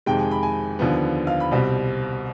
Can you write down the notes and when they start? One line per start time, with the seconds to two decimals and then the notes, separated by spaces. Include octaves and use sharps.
0.06 F2 C3 D#3 G#3 G5
0.19 G#5
0.31 B5
0.43 G#5
0.79 D#2 D3 F3 B3
1.27 F5
1.40 B5
1.51 C2 B2 G3 C4